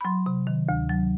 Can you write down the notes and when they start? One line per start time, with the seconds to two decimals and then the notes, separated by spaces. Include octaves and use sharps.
0.01 B5
0.05 F#3 C6
0.26 C3
0.47 D#3
0.69 D2
0.89 F#3